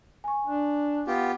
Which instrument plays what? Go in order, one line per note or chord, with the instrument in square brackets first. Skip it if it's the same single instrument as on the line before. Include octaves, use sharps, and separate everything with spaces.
[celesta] G#5 C#6
[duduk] D4
[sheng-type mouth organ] B3 F4 G4